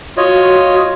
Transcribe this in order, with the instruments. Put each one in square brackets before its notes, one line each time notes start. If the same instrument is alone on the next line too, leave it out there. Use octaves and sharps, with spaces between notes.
[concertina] F4 C#5 D#5 [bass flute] F#4